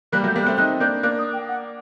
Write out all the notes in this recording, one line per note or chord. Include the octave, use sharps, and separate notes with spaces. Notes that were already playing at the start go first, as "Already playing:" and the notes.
G3 A#3 F#6
F#3 A3 G6
G3 A#3
F#6
A3 C4
C4 D#4 F#6
A#3 D4 G6
A#3 D4 F#6
D#6
G5
F#5